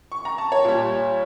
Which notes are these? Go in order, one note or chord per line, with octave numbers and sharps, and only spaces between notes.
C#6
A#5
A5
C#5
A#2 G3